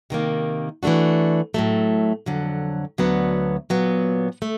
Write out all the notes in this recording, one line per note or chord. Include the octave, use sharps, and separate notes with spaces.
C3 D#3 G3 A#3
E3 A3 D4 F#4
A2 F#3 A3
F2 D3 F#3
D2 D3 F#3 B3
A#2 F#3 B3
A3